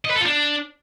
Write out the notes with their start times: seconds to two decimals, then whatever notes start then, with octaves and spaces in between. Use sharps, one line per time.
0.05 D#5
0.11 B4
0.16 A4
0.21 F4
0.26 D4